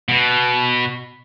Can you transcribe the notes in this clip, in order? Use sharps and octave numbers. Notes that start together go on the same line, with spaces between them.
B2